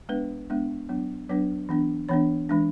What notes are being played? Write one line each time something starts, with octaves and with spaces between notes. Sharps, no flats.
G#3 B3 D4 B4
G#3 B3 D4
F#3 B3 D4
F#3 B3 D4 B4
E3 B3 D4
E3 B3 D4 C#5
E3 G#3 D4